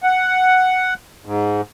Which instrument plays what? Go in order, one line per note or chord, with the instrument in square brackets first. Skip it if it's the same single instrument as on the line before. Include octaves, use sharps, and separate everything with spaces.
[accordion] F#5
G#2